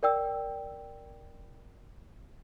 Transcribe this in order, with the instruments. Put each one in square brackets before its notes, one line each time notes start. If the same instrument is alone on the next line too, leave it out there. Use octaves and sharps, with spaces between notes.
[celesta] A#4 D5 G5 E6